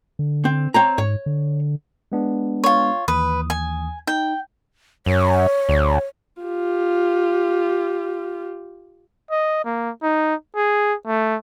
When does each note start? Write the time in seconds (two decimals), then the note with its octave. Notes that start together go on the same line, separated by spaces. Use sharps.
0.19 D3
0.45 C4
0.74 C4 C#5 A#5
0.98 G#2 C#5
1.26 D3
2.12 G#3 B3 D4
2.64 F4 C#5
3.08 D#2 E3 B4 D#6
3.50 G#5
4.07 D#4 G5
5.06 F#2 C#5
5.69 D2
6.42 F4 G4
9.31 D#5
9.65 A#3
10.03 D#4
10.56 G#4
11.06 A3